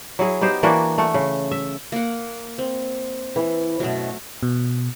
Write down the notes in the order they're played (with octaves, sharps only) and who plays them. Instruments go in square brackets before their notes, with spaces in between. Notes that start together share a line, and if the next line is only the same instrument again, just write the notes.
[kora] F#3 E4 G#4
B3 D#4 G4 C5
E3 A#3 D4 F#4
A3 F#5
C#3
E5
[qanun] A#3 F#5
C4
[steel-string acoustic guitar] E3
[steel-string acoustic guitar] F#2 B2 [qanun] F#3 A3
[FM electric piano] B2